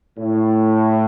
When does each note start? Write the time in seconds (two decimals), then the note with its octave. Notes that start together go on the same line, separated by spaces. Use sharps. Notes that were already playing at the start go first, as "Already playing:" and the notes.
0.19 A2